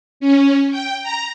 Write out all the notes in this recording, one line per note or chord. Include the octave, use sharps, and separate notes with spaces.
C#4
G5
A#5